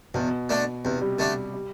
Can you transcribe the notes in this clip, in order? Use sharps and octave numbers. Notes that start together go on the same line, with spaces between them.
E2 B2
D3 A3 D4
E2 C3
G3
D3 G3 A3 D4
G3